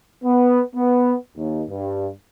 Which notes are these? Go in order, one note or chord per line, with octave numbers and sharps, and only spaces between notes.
B3
B3
D#2
G2